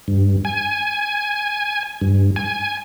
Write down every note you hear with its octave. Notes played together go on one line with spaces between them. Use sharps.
G2
G#5
G2
G#5